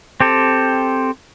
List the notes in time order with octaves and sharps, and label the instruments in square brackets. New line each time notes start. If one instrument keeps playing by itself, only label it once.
[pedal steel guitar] C4 G4 A4